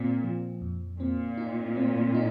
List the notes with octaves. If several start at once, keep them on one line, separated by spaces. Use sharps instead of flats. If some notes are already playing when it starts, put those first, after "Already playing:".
Already playing: A#2 C4
F3
F2
A#2 C4
D#4
C4
D#4